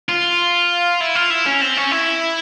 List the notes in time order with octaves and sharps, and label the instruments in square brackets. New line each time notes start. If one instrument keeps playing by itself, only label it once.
[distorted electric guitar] F4
E4
F4
E4
C#4
C4
C#4
E4